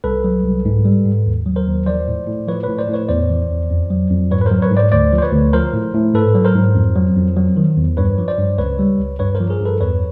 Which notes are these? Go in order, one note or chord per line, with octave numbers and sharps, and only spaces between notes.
C2 A4 B4
F#3
C2
G#2
G3
G#2
D#2
F#3
A#4 C5
D#2
F3 C5 D5
A2
A2
F3 B4 C#5
A2 B4 C#5
C5 D5
A2
B4 C#5
E2 C5 D5
E3
E2
F2
F#3
F2
G#2 B4 C#5
B4
F#3 A#4 C5
B4 C#5
G#2
C5 D5
D2 C5 D5
F3
C5
B4 C#5
D2
F3 A#4 C5
A2
A2
G#2 A4 B4
F#3
A#4 C5
G#2
F2
F#3
F2
F#3
D#3
E2
G2 B4 C#5
F3
C5 D5
G2
C#2 B4 C#5
G3
C#2
G2 B4 C#5
A#4 C5
F3
G#4 A#4
G2 A4 B4
E2 B4 C#5